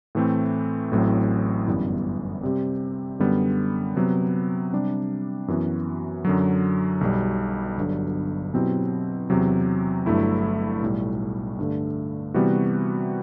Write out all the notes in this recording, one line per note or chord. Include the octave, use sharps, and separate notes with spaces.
A2 E3 A3 C4
A1 A2 F#3 C4
G1 F#2 E3 G3 B3
C3 G3 C4 G4
F#2 D3 G3 B3
C3 F#3 B3
C3 G3 D4
F#2 E3 B3 F#4
F#2 D3 F#3
B1 B2 G3
G1 G2 D3 F#3
B2 F#3 C4 E4 G4
E2 C3 F#3
G1 G2 F#3 A3 E4
B1 A2 G3
G2 D3 A3
C3 E3 G3 B3 F#4